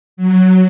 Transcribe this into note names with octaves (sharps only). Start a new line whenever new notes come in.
F#3